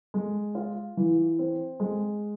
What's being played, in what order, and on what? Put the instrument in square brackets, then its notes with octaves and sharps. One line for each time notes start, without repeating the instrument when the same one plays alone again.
[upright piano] G#3
F4
E3
C4
G#3